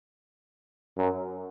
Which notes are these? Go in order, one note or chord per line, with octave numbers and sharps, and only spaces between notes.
F#2